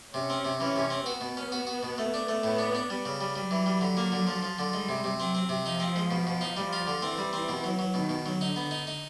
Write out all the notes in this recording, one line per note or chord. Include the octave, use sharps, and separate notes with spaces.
C3 C#4
C4
C3
E3 C#4
C3
C4
B3 F#4
B2
C#4
F#4
F#4
B2
A3
D4
A3
A2 B3
D4
D4
G3
C#3
G3
F#3 G3
E3
G3
D3
A#3
D3
F3
F3
D3
G3 G#3
C3
C3
F#3 C4
C4
C3
F3 D#4
C4
G#3
B2
B2
D#4
F3 G3
F4
D3
E3 C4
G3
C4
B2
F#3
F#3
B2 D#3
B2
F#3
D3 D#4
B3
D#4
D#4